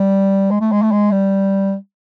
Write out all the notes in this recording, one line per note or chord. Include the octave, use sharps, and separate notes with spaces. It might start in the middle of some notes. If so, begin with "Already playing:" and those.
Already playing: G3
G#3
A3
G#3
A3
G#3
G3